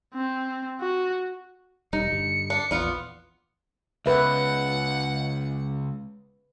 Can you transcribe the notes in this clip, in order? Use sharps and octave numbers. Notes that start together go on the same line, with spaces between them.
C4
F#4
E1 G3 D#4 C#7
G2 D3 G3
D4
A#1 E2 B3 F4 D5
C#2 B4 E5 F#5